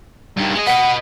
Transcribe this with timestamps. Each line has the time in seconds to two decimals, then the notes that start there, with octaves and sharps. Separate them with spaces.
0.37 G2 D#3
0.54 G#3 D#5
0.67 B4 D#5 F#5